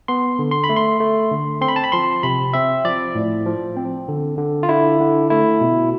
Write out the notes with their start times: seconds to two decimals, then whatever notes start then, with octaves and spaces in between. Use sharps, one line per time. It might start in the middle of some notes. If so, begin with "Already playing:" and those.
0.08 B3 C6
0.39 D3
0.51 C6
0.64 B5
0.69 A3
0.76 C6
1.00 A3
1.32 D3
1.61 C4 C6
1.68 B5
1.76 A5
1.84 B5
1.92 F3 C6
2.23 C3 B5
2.53 C4 E5
2.85 F3 D5
3.15 A2
3.46 F3
3.77 C4
4.08 D3
4.38 D3
4.63 F4
4.69 D3 E4
5.01 D3
5.30 A3 E4
5.61 B2